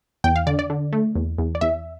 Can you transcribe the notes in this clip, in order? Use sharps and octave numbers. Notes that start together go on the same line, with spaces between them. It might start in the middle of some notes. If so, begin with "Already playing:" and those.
E2 G5
F5
D3 D5
D5
D3
A3
E2
E2
D5
E2 E5